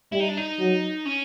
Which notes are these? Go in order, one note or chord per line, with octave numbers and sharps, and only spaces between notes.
G3 E4
D#4
D4
D#4
F#3
C#4